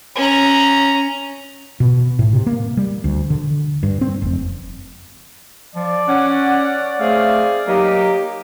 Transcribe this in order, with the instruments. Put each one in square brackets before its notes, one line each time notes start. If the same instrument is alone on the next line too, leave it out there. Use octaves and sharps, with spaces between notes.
[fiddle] C#4 A#5
[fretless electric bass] B2
A2
C3
A#3
G3
D2
D3
G2
C4
F1
[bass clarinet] F3 [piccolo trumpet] D5
[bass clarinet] C#4 [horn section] C#5 F#5
[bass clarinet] A3 [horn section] C4 G#4 F5
[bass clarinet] F#3 [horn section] A#3 D#4 [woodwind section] G4